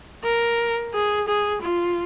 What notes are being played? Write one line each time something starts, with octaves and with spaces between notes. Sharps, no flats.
A#4
G#4
G#4
F4